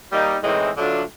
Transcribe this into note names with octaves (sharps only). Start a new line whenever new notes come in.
G3 A#3 D#4
A2 E3 G#3 C4 D#4
D3 F#3 A3 D4 F4